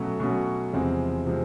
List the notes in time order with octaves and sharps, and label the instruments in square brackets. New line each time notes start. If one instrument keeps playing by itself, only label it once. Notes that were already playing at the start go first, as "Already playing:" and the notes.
Already playing: [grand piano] B2 F#3 A3 C#4 F#4
B2 F#3 A3 C#4 F#4
E2 C3 F3 G#3 C4
C3 F3 G#3 C4